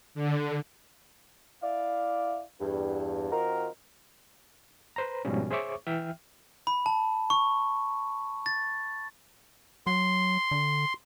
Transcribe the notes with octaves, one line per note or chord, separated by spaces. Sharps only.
D3
E4 D5 F5
E2 G2
D#3 C4 D#4 F4 F#4 A#4
B4 C5 A#5
G#2 B2 F3 G3 C#4
G#4 C5 C#5 E5 C#6 D6
E3 E5 G5 F6
B5
A5
C#6
A6
F#3 C6
D3